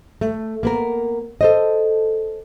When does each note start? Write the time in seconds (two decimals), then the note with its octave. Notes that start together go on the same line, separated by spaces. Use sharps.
0.21 A3
0.63 A#3 B3 A#4
1.41 A4 C5 D#5